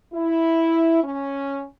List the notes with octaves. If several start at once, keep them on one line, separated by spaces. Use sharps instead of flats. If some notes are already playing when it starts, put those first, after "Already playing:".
E4
C#4